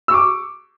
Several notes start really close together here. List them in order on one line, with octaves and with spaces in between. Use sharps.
E6 C#6 D6